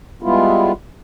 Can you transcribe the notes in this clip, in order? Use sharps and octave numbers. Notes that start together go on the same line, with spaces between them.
G3 G#3 B3 E4 F4